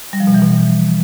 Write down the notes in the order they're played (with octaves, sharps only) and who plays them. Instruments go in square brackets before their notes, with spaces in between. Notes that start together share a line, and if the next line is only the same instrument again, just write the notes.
[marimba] G3
F3
B2
E3
B2